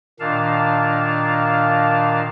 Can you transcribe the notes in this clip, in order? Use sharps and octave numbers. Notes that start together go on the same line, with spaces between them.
A#2 D#3 D4 F5 A5